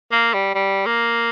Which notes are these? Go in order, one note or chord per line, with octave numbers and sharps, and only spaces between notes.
A#3
G3
G3
A#3